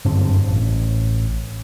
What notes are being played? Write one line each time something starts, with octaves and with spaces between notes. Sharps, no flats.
F#1 G2 D3 C4
A1